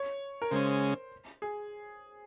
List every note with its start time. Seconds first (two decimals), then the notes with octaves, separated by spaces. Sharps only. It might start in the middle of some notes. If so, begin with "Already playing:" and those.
Already playing: C#5
0.42 A#4
0.51 C#3 G#3 C#4 C5
1.42 G#4